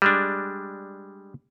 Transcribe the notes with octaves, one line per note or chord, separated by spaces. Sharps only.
G3 G#3 D4